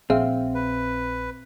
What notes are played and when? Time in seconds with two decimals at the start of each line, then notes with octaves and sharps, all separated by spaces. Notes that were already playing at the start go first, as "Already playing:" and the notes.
0.10 A#1 C4 G#4 E5 F5
0.55 B4